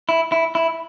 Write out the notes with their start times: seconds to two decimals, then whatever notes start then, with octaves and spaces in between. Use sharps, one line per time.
0.09 E4
0.32 E4
0.55 E4